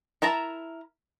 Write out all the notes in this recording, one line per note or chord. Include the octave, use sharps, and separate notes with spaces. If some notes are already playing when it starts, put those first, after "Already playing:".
E4 A#4 A5 A#5